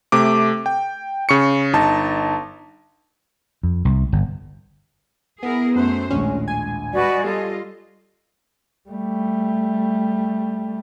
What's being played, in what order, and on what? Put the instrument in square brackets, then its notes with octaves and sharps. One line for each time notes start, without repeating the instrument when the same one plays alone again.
[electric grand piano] C3 A3 D6
G5
C#3 C#6 C#7
G1 D#4 A5
[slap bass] F2
C2
G1
[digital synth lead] B3 [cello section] E4 G#4 A#4
[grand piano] F#2 F#6 [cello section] A3 C5
[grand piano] A#1 D#2 A2 [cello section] G#3 [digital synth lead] C#4
[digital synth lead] G#5
[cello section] G3 B4 D#5 [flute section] F#4 D5
[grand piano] G3 [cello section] F4 D#5 [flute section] A4
[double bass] G3 A3